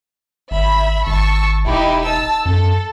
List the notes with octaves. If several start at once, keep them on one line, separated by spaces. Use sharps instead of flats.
G#1 E5 B5
G#1 A5 C#6 E6
E1 D#4 E4 G4
A5 E6
F#2 A4